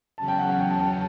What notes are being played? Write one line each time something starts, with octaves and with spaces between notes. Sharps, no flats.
E2 C#3 F#3 C#4 A5
G5
F#5
F#5
G5
A5
G5
A5